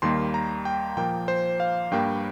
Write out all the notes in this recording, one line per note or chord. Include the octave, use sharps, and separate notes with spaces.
D#2 D#3 G3 A#3 C6
A#5
G5
A#2 F3 A#3 G5
C5
F5
G2 G3 A#3 G5